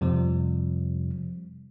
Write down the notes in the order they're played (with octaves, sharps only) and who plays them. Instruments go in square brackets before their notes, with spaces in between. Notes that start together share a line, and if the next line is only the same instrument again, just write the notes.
[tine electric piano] F2 C3 F3 G3